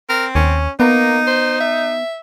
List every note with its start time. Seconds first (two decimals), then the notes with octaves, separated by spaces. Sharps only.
0.09 C4 A#4
0.35 D#2 C#4
0.80 A#3 B3 D#4
1.27 C5
1.61 E5